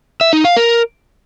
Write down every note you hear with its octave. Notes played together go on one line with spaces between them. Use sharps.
E5
D#4
F5
A#4